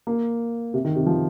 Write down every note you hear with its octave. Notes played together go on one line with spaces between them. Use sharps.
A#3
C3
D#3
C3
F3